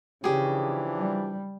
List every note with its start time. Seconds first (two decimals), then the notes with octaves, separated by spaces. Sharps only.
0.24 C#3 E3 F3 D4 G4 G#4
0.98 G3